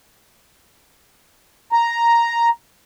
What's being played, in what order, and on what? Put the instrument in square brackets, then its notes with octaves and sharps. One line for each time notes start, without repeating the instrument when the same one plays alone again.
[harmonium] A#5